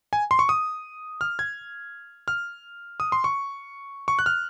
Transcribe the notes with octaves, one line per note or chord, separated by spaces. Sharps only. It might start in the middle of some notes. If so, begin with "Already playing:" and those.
G#5
C6
C#6
D#6
F6
G#6
F6
D#6
C6
C#6
C#6
F#6
F6